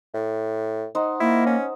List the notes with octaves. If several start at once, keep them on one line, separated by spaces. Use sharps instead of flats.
A2
D#4 C5 F#5
A#3 E4
C#4